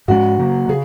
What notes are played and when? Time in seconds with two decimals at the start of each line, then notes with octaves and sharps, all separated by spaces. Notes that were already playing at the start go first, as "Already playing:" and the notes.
0.08 G#2 G#3 C#4 F#4
0.39 C#3 F#3 A#3
0.69 C#3 G#4